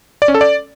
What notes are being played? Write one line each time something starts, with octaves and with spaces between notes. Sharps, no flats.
D5
C#4
A4
D5